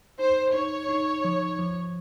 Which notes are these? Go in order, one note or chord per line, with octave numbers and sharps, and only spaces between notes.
D#4 C5
D#4 C#5
D#4
F3
F3